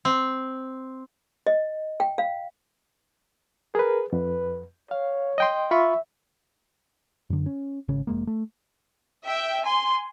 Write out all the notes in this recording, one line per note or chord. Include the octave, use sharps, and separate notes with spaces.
C4
D#5
G5
F5
G#4 A#4 B4
F2 B4
C#5 F5
D#5 G5 C6
F4 E5 B5 C#6
F#2 D3
C#4
G#1 C#3 C#4
F1 G#3 A#3
A3
E5 G5
G#5 C6